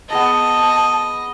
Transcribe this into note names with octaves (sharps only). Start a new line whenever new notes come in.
B3 G#4 D#5 A5 A#5